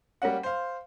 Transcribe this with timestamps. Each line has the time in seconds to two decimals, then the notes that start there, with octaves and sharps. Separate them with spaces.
0.22 G3 A#3 C#4 F#5
0.43 C5 F5